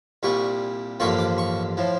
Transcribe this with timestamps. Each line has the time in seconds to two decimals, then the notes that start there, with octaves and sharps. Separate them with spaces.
0.23 C2 A#2 G3 C#6
1.00 A1 G2 D3 F3 A#3 C#6
1.19 D6
1.38 C#6
1.77 A2 F3